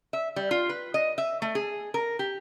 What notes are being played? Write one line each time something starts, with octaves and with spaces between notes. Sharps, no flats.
E5
G3
F4
B4
D#5
E5
A3
G#4
A#4
G4